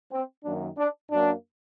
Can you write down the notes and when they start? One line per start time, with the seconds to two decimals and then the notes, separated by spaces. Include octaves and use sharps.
0.12 C4
0.44 F#2 D#3 F#3 A#3 D4
0.77 D4
1.10 F#2 F#3 A#3 D4